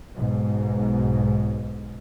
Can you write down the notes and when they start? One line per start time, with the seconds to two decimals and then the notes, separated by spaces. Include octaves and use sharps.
0.15 B1 G#2 B2